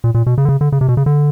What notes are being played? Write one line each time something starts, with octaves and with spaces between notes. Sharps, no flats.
A#2
A#2
B2
C#3
D3
C#3
D3
C#3
C3
B2
C#3
D3